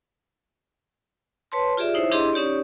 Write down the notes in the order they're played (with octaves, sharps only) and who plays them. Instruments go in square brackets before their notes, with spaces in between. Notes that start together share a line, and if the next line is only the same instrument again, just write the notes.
[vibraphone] B4 C#5 A5 C6
F4 G4 G#4 D5 E5
D#4 E4 C5 C#5 E5
D4 E4 G4 G#4 D#5 C6
C#4 D#4 G4 C#5 D5